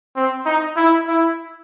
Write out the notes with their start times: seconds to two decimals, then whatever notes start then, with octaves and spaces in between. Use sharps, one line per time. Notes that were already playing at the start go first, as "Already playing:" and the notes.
0.16 C4
0.46 D#4
0.76 E4
1.07 E4